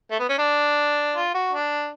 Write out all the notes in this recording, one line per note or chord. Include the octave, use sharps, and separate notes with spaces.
A3
B3
C#4
D4
F4
F#4
D4